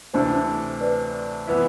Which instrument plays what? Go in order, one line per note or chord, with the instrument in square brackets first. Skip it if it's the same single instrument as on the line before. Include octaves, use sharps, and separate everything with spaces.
[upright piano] D2 C3 E3 A3 D4 [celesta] C5
[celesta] B4 D5
[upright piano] E3 B3 E4